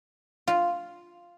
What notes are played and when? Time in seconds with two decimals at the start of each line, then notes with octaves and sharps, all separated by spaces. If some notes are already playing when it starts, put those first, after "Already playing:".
0.48 F4